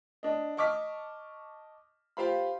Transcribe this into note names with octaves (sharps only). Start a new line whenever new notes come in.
D4 D#5
D#5 A5 C#6 D6 F6 B6
F4 G4 C5 F5 B5